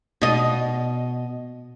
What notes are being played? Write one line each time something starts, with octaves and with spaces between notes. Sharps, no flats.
B2 D#5